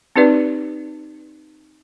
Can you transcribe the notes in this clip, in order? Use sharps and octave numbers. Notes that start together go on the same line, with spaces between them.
C4 D#4 G4 B4 D5